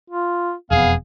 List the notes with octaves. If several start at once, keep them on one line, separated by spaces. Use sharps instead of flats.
F4
E1 F2 B3 G#4 F5